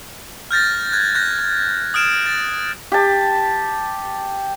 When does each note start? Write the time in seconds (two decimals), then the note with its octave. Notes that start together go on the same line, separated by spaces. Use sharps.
0.51 F6 G6 A6 A#6
0.92 F#6 G#6
1.15 F#6 G6 A#6
1.94 D#6 F6 D7 E7
2.26 A6
2.92 G4 A5